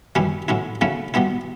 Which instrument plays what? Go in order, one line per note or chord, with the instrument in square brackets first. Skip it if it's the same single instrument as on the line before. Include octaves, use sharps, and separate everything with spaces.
[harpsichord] F#2 E3 G3 C#4 E4
A2 F#3 C#4 E4
C#3 F#3 A3 C#4 E4
B2 G3 B3 E4